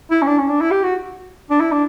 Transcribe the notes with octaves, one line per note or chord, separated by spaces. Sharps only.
E4
C#4
D4
C#4
D4
E4
G4
F#4
D4
E4
D4